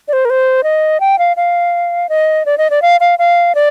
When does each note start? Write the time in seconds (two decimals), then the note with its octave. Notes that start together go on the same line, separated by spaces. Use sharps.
0.08 D5
0.13 C5
0.25 A#4
0.30 C5
0.64 D#5
1.00 G5
1.19 F5
1.37 F5
2.09 D#5
2.46 D5
2.58 D#5
2.70 D5
2.82 F5
3.00 F5
3.19 F5
3.55 D5